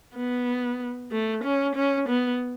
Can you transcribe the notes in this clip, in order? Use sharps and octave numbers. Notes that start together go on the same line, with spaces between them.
B3
A3
C#4
C#4
B3